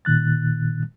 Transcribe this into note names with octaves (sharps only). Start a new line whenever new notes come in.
A#2 D#3 F#6 A6